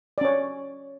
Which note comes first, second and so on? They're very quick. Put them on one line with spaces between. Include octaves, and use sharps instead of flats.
D5 C#4 C#5